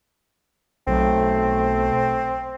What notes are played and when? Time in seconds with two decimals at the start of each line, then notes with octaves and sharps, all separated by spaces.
0.87 B1 A3 C4